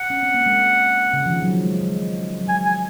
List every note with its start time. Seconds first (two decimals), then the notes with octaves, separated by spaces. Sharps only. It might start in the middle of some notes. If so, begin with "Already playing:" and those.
Already playing: F#5
0.10 C#4
0.23 C4
0.34 A#3
0.46 G#3
1.13 C#3
1.26 F3
1.30 D#3
1.42 F#3
1.47 F3
1.64 G#3
1.81 G#3
2.41 F#3
2.48 G#3 G#5
2.65 G#5